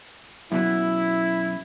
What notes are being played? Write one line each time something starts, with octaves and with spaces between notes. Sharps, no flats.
F#2 B2 F#3 E4